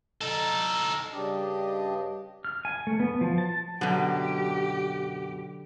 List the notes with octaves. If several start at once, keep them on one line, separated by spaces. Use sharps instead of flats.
D#4 A4
G2 C#3 D4 G4 D#5
F6
G#5
A3
B3
F3
A5
F#2 B2 D3 F#3 G4